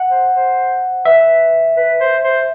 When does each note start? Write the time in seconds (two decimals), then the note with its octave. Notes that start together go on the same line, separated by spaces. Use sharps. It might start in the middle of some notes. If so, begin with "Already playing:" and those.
Already playing: F#5
0.10 C5
0.34 C5
1.05 B4 E5
1.77 B4
2.00 C5
2.24 C5